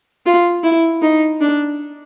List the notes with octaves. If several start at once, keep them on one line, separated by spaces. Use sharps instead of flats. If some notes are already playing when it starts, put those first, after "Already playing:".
F4
E4
D#4
D4